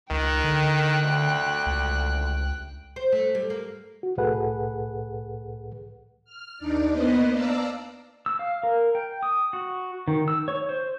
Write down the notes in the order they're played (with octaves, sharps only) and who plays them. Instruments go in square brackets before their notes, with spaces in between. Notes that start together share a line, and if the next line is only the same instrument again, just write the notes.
[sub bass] C#2 [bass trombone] D#3 [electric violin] G5 F#6
[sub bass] D3
[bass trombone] D2
[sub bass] C#2
[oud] C5
A3
G3
A#3
[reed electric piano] F#4
C2 A2 G#4 A4 B4 F#5
[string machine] F6
D#2 D4 D#4 D5
A#3 B3 B4 C5 D#5
D5 F5 A5 A#5 E6
[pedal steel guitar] E6
F5
A#4
G5
D#6
F#4
D#3
E6
C#5
C5